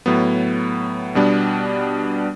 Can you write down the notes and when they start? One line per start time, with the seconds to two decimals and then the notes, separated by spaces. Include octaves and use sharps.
0.06 A2 F#3 B3
1.15 B2 G3 B3 D4